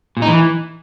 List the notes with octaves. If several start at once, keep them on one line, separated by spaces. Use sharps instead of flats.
A#2
D#4
E3